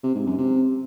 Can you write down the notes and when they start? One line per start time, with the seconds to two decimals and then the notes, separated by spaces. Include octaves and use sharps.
0.03 C3
0.15 G#2
0.26 F#2
0.38 C3